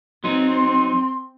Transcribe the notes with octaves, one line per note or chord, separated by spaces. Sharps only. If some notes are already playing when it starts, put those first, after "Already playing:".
F#3 C4 D#4 C6